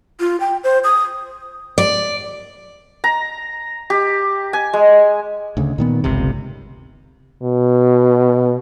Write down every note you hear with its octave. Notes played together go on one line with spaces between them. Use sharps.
F4
G5
C5
D#6
D5
A#5
G4
G#5
G#3
D2 C#3
A#2 D#3 B3
G1 C#2 C3
B2